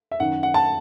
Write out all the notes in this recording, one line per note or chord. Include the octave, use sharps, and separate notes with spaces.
E5
F#2 D#3 F#5
F#5
A5